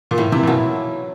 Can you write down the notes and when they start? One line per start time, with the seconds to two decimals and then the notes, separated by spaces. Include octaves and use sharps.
0.11 A#2
0.18 A2 E3
0.32 C3 E4
0.43 A#2
0.47 B2 F#3